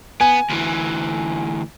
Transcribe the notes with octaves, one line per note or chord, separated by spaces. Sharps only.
B3 G#5
D2 E3